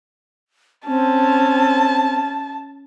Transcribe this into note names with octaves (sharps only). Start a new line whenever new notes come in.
C4 C#4 A5